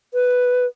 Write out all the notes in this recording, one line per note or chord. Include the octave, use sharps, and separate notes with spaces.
B4